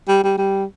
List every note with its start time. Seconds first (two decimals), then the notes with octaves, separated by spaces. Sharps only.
0.09 G3
0.24 G3
0.38 G3